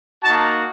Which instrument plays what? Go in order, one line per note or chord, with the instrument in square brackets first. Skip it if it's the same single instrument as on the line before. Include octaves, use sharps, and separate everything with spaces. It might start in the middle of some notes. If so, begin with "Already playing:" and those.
[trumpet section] A#3 D#4 F#4 A5